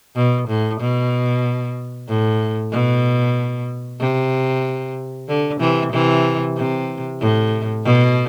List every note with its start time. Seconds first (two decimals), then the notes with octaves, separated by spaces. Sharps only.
0.16 B2
0.49 A2
0.80 B2
2.09 A2
2.72 B2
4.01 C3
5.28 D3
5.60 C3 E3
5.93 C3 E3
6.57 C3
7.21 A2
7.85 B2